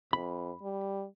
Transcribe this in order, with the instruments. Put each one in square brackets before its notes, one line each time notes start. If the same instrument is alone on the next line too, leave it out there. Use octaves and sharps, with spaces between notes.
[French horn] F2 [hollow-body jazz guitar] B5
[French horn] G3